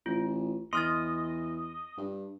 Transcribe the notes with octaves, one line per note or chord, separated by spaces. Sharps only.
A1 F4
E2 D#5 C6 F6 A6
G2